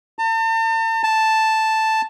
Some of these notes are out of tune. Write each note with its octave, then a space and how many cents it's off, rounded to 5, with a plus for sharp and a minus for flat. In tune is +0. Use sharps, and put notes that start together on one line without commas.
A5 +40
A5 +0